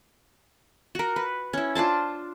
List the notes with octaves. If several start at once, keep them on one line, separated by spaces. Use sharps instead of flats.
F#4 A#4
B4
C#4 E4
D4 F4 C5 A5